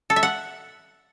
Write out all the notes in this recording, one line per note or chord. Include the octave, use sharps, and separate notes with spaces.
A4
E5
F#5